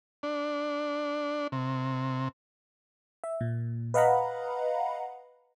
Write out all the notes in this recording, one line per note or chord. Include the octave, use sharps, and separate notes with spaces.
D4
C3
E5
A#2
B4 D#5 F5 F#5 A#5 B5